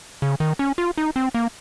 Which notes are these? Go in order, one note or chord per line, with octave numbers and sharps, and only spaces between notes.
C#3
D#3
C#4
F4
D#4
C4
A#3